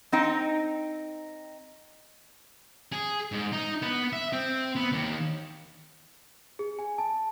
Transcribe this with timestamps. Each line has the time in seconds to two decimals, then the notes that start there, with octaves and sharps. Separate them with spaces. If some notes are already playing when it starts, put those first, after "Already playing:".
0.12 C4 D#4 G5
2.92 G#4
3.32 G#2
3.52 D#4
3.82 B3
4.13 E5
4.32 C4
4.76 B3
4.92 D#2
6.59 G#4
6.79 G#5
6.98 A5